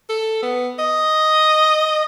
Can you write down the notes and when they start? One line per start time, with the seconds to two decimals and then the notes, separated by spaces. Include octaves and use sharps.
0.09 A4
0.42 B3
0.79 D#5